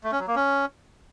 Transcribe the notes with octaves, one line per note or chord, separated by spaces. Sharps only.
A3
C#4
F#3
A#3
C#4